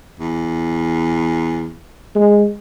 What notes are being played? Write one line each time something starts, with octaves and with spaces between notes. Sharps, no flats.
E2
G#3